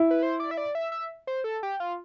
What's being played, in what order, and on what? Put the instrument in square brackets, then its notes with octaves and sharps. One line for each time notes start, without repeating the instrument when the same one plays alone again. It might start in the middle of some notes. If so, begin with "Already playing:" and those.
Already playing: [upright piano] E4
[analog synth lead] B4
C5
D5
E5
D5
E5
E5
C5
A4
G4
F4